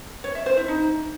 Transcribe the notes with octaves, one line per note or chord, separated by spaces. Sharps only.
C#5
E5
C5
E4
D#4